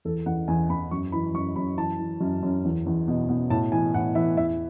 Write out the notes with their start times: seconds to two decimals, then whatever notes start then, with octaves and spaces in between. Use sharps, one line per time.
0.05 E2 A4
0.26 E2 F#5
0.48 E2 G#5
0.70 E2 B5
0.91 F#2 C#6
1.12 E3 B5
1.34 F#2 C#6
1.56 F#2 B5
1.78 E3 A5
1.99 E3
2.21 F#2
2.43 F#2
2.65 E2
2.86 E2
3.08 B2
3.29 B2
3.50 A2 A5
3.72 E3 G#5
3.94 A2 F#5
4.15 E3 E5
4.37 E2 E5